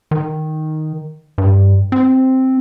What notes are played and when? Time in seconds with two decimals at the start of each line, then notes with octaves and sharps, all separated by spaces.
0.11 D#3
1.38 G2
1.92 C4